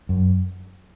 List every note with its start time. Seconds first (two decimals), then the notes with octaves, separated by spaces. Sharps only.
0.09 F#2